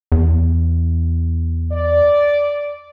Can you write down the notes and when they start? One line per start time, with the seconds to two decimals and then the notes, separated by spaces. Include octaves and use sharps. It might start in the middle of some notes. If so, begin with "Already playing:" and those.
0.12 E2
1.72 D5